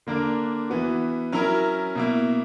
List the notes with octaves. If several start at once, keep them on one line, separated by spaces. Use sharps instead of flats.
D3 A#3 D4 A#4
E3 B3 F#4
F#3 C#4 E4 A#4
B2 A#3 E4